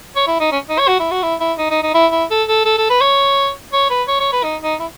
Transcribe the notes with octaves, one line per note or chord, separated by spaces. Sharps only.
C#5
E4
D#4
C#4
D#4
C#5
F#4
E4
F#4
E4
E4
D#4
D#4
D#4
E4
E4
A4
A4
A4
A4
B4
C#5
C#5
B4
C#5
C#5
B4
D#4
D#4
E4